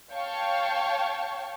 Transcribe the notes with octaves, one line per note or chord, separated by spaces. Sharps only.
C#5 F5 G5 A5 C#6